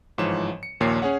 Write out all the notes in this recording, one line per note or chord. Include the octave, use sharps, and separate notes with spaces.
G1 G#2 E3 F3 C#5 E7
C#7
A#1 D#2 A#2 A#3 C#5 C7
C#4 G#4 C#5 F#5